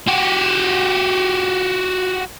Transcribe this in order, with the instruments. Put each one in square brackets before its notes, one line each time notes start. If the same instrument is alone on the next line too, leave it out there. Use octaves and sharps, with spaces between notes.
[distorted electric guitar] F#4 G4